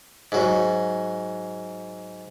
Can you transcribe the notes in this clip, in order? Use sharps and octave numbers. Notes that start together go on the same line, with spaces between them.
G#2 F#3